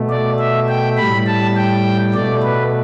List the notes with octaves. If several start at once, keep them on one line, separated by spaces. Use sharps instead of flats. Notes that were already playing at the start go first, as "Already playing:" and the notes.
Already playing: B2 A3
D5
E5
G5
A2 G3 B5
A5
G5
B2 A3 D5
B4